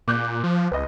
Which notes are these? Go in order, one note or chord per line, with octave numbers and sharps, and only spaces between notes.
A#2 D6 F#6 G6
F3
C#2 B4 D#5